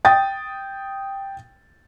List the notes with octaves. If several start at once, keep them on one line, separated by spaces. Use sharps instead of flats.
G5 D#6 A6